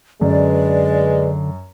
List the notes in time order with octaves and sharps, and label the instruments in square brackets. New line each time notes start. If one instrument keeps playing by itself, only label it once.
[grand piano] F#2 [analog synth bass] D3 [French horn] G#3 [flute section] B4 D5